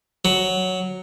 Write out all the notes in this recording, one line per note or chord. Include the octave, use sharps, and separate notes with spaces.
F#3